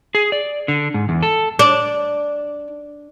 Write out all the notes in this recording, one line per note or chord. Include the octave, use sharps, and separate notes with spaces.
G#4
D5
D3
G#2
E2
A4
D4